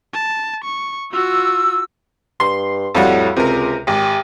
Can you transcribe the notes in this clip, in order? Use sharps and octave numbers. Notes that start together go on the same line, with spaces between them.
A5
C#6
F4 F#4 E6
G2 C6
F2 A2 G3 F#4
C#2 C3 A#4
G#1 G4